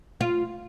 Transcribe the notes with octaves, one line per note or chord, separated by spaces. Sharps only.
F4